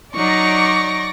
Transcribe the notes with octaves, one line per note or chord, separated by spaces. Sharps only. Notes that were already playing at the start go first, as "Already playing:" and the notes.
F#3 D#4 D5 C#6 D6 A#6